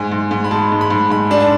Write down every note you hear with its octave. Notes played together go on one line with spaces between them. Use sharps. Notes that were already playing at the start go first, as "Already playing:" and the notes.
Already playing: G#2 G#5
G#2
G#2
B5
G#3 A5
G#2
B5
G#2
G#2 B5
D4
A5